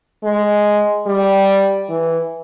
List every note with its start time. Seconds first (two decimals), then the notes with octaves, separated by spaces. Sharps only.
0.24 G#3
1.07 G3
1.90 E3